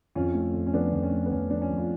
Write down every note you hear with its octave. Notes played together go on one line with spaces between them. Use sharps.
F2 C#4 F4
A3
F2
C#4
F3 B3 D4
F2
C#4
A3
B3
F2 C#4
F3 D4
C#4
F2
F4